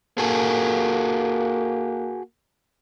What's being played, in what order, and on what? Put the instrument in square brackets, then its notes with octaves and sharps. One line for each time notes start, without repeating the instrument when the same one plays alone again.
[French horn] A#3 [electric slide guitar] F#4 G#4 A4